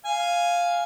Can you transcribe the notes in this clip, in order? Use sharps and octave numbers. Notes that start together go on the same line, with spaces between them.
F5 G#5